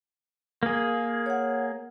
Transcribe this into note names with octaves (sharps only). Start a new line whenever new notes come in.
A#3 G#4
C#5 F#5